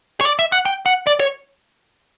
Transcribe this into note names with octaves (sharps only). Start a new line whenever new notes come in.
C#5
D5
E5
F#5
G5
F#5
D5
C#5